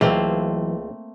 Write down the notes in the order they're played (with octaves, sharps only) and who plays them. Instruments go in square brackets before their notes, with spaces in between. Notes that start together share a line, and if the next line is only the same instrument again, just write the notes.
[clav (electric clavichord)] C#2 [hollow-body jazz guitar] E3 F#3 [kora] A3 A#3 C4